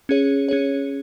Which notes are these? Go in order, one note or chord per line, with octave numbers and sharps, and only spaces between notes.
C#4 G#4 C#5
C#4 G#4 C#5